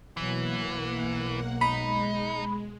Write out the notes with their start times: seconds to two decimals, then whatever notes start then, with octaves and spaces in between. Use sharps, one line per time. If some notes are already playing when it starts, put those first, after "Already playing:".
0.17 B2 E3 F#3 A#3 F#5
0.65 B1
1.61 G#3 D#4 B5